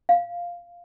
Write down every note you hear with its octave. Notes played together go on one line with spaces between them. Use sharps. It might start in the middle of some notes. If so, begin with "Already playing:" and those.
F5